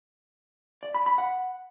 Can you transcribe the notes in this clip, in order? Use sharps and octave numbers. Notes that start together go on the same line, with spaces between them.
D5
B5
B5
F#5